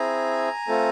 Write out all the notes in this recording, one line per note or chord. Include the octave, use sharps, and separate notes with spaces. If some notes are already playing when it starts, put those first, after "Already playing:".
Already playing: C4 E4 G#4 G#5 A#5
A3 C4 F4 A4